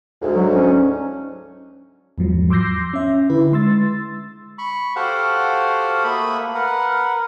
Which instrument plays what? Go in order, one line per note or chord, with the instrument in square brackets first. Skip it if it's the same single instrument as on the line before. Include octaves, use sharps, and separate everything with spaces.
[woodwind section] D2 G#2
[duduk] F#3
C#4
[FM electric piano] E2 G#2 F3 F#3
C6 D6 E6 G6 A#6 C7
C#4 E5
D3 E4 B4
G#3 C6 E6 A6
[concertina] B5 C#6
F#4 G4 A4 C5 F5 F#5
A3 A#3 E5 B5 D#6
A#4 B4 F#5